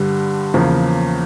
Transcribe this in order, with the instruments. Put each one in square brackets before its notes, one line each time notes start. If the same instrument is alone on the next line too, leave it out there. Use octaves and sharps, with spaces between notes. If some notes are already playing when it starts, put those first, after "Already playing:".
Already playing: [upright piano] G2 D3 G3
E2 C#3 F3 A#3